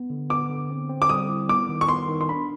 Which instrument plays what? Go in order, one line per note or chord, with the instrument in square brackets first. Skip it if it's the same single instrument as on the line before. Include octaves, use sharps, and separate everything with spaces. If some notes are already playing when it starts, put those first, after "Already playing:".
Already playing: [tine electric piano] B3
D3
[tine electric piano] B3 [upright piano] D6
[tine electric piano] D3
C4
C4
[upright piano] D6
[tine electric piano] G3 [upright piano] D#6
[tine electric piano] E4
[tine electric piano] B3 [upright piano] D6
[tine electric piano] D#3
[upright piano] C#6
[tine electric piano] B3 [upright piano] C6
[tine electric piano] D#3
[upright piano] C6
[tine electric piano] D4 [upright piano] B5